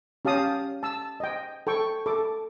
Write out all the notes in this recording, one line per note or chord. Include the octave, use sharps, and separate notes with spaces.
C#4 G4 F5 A5 D#6
A5 E6
D#5 G5
A4 G5 C#6
A4 D6